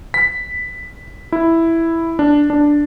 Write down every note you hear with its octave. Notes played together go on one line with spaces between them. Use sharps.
B6
E4
D4
D4